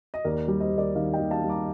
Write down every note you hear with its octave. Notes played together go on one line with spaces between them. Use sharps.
D#5
D#2 A#4 D5
G3
C5 D#5
D#2
A#4 D5
D#3 D5 F5
D#5 G5
D#2
F5 A5
G3
A#5 D6